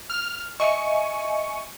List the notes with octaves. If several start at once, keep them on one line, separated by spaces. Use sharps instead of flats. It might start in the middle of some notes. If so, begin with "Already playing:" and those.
F6
D#5 E5 G#5 C#6